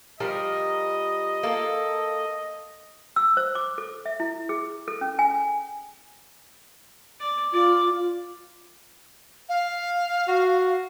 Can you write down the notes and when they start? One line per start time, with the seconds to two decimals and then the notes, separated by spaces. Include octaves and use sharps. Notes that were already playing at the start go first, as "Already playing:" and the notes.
0.20 F3 G3 A#4 D#5
1.43 A#3 A4
3.16 E6
3.37 C5
3.55 D6
3.78 A4
4.06 E5
4.20 E4
4.49 G#4
4.88 A4
5.01 C#4
5.19 G#5
7.20 D5
7.53 F4 D5
9.49 F5
10.28 F#4